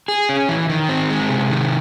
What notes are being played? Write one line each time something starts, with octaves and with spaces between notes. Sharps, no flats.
G#4
C#4
E3
D#3
C4
G#3
C3
D#3